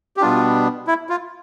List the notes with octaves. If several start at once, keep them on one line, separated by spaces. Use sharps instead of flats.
G4
B2 G3 B3 D4 F4
E4
F4